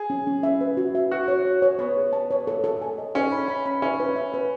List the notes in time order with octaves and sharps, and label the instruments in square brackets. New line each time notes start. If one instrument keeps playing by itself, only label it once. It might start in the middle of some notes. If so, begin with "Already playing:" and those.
Already playing: [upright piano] G#4
[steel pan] C#4
C#4
E5
B4
F#4
E5
[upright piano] F#4 [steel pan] E5
[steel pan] C#5
C#5
C#5
[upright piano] B3 [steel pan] C#5
[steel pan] G#4
A5
C#5
A4
A4
G#5
D#5
[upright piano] C#4 [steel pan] D#5
[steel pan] B5
B5
B5
[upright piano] C#4 [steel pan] E5
[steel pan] B4
E5
B4